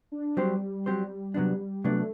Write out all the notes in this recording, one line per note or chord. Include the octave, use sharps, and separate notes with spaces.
D4
F#3 G3 C4 G4 C5
F#3 C4 G4 C5
C3 F#3 B3 D4
C3 F#3 A3 B3 D4